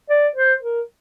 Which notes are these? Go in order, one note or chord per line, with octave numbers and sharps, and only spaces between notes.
D5
C5
A#4